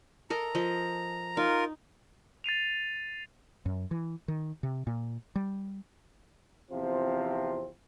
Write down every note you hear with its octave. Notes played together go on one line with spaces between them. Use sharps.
A4 A#4 D#5 A#5
F3 D#5
D#4 F4 A#4
A6 C7 D#7 F7
F#2
E3
D#3
C3
A#2
G3
E2 C3 F3 C4 F4